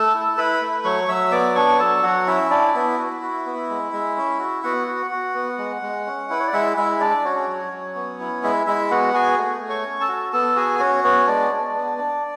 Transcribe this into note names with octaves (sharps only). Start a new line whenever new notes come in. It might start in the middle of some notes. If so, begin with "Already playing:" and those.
Already playing: A3 A4 A5
E4
E4 B4 B5
A3
F#3 C#5 C#6
F#3 E5 E6
B3 D5 D6
D4 C#5 C#6
F#3 A4 A5
F#3 F#4 F#5
C#4 E4 E5
D4 E4 D5
B3 E4 E5
F#4
F#4
B3
G#3
G#3
C#4
F#4
B3 F#4 F#5
F#4
F#4
B3
G#3
G#3
C#4
E4 B4
C#5
D5
G#3 E4 E5
G#3 E4 E5
D4 D5
C#4 F#4 C#5
F#3
F#3
B3
E4
G#3 E4 E5
G#3 E4 E5
B3 F#4 F#5
F#4 G#4 G#5
A3
A3
C#5 C#6
C#4
A4 A5
F#4
B3 A4 A5
F#4 G#4 G#5
C#4 F#4 C#5
B3 C#4 C#5
G#3 D4 D5
G#3
B3
D4